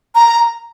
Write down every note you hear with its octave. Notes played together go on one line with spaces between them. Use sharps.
A#5